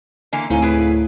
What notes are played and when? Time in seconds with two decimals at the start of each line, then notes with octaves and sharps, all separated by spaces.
0.33 D3 E3 A#3
0.50 D2 A2 C4 D#4 A4 F5 G#5
0.62 E4 G#4 B4